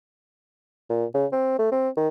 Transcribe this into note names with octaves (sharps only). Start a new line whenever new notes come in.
A#2
C#3
C4
A3
C4
D#3